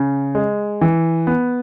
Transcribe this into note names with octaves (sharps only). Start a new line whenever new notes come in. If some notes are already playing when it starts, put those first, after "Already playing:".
Already playing: C#3
G#3
E3
B3